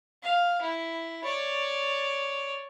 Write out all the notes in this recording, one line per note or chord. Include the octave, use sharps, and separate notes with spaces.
F5
E4
C#5 D5